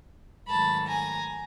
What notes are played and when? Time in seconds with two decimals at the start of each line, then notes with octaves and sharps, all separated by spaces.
0.48 G#2 D#3 F#3 A3 A5 B5
0.87 G#5 A#5